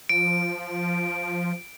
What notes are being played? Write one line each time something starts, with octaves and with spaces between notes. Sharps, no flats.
F3 D7